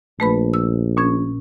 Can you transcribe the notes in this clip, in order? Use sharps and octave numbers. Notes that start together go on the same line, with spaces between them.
A#1 A3 B4 B5
E6
A#2 C#4 G#6